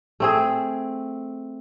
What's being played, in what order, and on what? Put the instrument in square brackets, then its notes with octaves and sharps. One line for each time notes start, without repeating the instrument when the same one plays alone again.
[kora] A3 C4 G#4